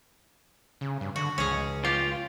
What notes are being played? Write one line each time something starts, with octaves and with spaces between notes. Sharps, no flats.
C#3
G2
D3 F#4
C#2 C#4 G#4
F4 G4